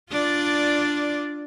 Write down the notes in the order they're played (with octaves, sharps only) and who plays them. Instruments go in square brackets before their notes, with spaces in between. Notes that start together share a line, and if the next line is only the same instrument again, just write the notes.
[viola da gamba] D4 F4 D5